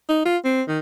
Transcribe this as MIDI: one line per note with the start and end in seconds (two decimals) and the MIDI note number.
0.09 0.21 63
0.25 0.37 65
0.45 0.62 60
0.68 0.79 51